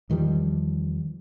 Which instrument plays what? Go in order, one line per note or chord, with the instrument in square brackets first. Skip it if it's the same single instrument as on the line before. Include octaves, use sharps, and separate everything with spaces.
[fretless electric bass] E2 D#3 F3 G3